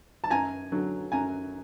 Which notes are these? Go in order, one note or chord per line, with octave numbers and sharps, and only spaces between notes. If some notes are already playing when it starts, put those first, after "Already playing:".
A5
F#2 G#5 A#5
D3 F#3
F#2 G#5 A#5